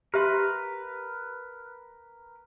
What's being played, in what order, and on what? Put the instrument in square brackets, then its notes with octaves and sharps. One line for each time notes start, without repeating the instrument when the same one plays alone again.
[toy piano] G4 E5 C6 [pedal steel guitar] A#4 B4